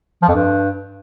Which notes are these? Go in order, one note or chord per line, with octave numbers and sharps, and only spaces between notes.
F3
F2
G2